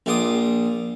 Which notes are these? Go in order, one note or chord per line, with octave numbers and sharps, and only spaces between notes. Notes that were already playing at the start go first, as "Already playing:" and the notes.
A#1 F4 D6 D#6